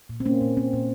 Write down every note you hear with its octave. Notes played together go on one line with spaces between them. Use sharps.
A#2
C4
A#3 C#4
A#2
A#3 C4
A#2